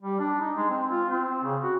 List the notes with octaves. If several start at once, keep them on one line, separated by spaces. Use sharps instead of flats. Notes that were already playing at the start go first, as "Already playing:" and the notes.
G3
D4
D#4
G#3
C4
F4
C4
C#3
F#4